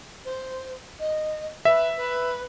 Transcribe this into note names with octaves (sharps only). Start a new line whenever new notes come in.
C5
D#5
B4 E5
B4